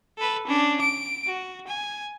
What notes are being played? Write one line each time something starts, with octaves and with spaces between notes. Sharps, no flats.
A4 B4
C#4 D4
D7
F#4
G#5